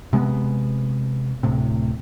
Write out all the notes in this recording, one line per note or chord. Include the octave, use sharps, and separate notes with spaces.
C3 G#3 A#3 B3
D1 A2 C3